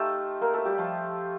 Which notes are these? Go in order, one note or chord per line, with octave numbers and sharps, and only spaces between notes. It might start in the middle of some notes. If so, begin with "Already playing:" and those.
Already playing: A3 D#4 F4 G4 A4
A#3 A#4
A3 A4
G3 G4
F3 F4